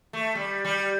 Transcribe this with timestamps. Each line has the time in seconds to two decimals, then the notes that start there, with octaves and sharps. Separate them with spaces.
0.13 A3
0.35 G3
0.65 G3